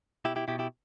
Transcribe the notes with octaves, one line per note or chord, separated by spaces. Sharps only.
B2 E4 G4
E4 G4
B2 E4 G4
E4 G4